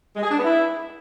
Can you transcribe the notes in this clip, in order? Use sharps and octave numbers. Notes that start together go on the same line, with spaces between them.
G#3
G#4
D4
B3
E4